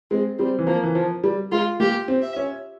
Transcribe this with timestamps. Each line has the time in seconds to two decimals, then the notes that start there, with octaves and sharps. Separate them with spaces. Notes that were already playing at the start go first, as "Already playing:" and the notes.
0.11 G#3 C4
0.39 G3 C4
0.59 E3
0.67 F3 A#3
0.83 E3
0.95 F3
1.24 G3
1.52 G#3 F4
1.80 A#3 G4
2.08 C4
2.22 E5
2.36 C#4